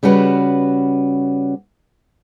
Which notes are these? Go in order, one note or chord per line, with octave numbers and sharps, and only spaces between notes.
C#3 G3 C#4 F#4 B4